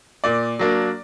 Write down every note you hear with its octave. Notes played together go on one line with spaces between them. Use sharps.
A#2 D5
F#3 A#3 D4